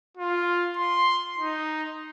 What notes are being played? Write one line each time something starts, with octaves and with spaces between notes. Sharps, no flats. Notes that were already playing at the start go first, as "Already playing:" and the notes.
F4
C6
D#4